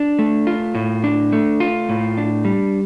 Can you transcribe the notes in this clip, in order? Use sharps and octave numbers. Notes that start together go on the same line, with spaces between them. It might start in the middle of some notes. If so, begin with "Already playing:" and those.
Already playing: D4
A3
F4
A2
D4
A3
F4
A2
D4
G3